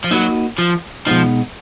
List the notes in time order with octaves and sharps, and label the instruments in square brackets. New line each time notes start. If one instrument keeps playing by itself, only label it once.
[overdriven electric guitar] F3
[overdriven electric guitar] F#3 [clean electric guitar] A#3 D#4 F#4 B4
[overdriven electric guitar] F3
[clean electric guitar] B2 G#3 B3 D#4 [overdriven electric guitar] F3